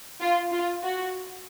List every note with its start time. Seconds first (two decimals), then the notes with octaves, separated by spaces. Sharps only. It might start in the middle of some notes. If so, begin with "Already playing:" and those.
0.21 F4
0.52 F4
0.83 F#4